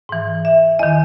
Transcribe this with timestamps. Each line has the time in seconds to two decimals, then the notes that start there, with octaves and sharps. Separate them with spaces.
0.09 G#2 E3
0.45 E5
0.79 E2 D#3 D#5